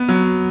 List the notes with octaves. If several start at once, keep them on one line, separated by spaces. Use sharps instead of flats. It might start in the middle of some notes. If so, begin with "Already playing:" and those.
Already playing: B3
F#3